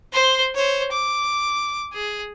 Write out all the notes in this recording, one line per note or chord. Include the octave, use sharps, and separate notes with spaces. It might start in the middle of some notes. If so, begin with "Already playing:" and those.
C5 C6
C5 C#5
D6
G#4